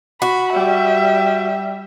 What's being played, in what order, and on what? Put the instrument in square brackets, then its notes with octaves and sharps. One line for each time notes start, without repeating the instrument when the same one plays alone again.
[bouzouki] F#4 [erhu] B5
[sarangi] G3 [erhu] E5